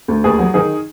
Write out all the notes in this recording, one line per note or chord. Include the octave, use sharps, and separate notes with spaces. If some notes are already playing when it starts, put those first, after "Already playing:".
D2
D#2 G#4
F#3
D#3 G#4